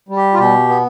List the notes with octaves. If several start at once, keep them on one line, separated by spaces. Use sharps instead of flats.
G3
G4
F4
B2 G4
B3